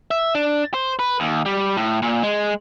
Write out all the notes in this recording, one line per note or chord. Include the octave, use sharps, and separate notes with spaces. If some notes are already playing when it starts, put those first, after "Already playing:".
E5
D4
C5
B4
D#2
G3
A2
A#2
G#3